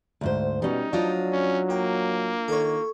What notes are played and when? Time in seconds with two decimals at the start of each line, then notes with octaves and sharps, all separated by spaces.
0.21 D2 G#2 C5
0.62 B2 G3 C#4 D#4
0.93 F3 F#3 D4 F4 D#5
1.33 C#4
1.70 A#3 G5
2.48 D#3 A4 C#5